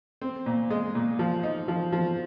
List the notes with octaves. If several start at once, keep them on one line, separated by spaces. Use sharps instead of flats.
C4
A#2
G#3
A#2
F3
D#4
F3
F3